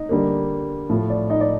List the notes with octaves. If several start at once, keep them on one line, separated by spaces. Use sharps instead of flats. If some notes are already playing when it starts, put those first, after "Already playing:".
Already playing: D#4 D#5
D3 G3 A#3
A2 F3 A3
D5
D#4 D#5
D5